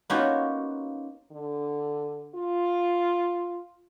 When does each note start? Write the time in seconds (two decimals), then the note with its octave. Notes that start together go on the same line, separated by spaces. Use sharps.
0.10 A#3 B3 C#4 D#4 F4 F#4
1.32 D3
2.35 F4